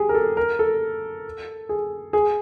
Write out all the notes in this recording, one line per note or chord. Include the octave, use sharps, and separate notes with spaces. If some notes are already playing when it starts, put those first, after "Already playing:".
Already playing: G4 G#4
A#4
A4
A#4
A4
G#4
G#4